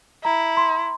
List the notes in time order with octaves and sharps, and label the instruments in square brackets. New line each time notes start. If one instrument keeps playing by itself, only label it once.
[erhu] E4 [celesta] A#5
[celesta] C6